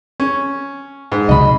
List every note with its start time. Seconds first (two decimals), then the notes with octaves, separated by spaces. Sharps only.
0.20 C#4
1.12 G#2
1.29 C#2 C3 F#3 D#5 B5